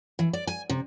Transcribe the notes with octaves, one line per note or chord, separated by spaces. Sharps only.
E3
D5
G#5
C3